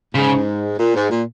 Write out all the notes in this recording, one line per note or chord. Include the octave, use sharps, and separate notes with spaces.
G#2 C#3
A#2
G#2
A#2